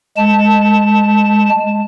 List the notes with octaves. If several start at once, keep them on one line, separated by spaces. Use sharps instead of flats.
G#3 A5